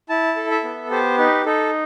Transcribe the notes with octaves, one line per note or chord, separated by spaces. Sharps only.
E4 A5
A4
E5
B3
G4 C5
D#4 B4
D#4 A4